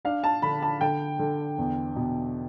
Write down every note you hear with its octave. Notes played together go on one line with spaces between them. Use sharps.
D4 F5
A5
D3 B5
A5
D3 G5
D3
E2
B2